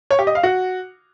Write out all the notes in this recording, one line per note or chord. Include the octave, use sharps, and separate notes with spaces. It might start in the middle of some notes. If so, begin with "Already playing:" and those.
C#5
G4
D#5
F5
F#4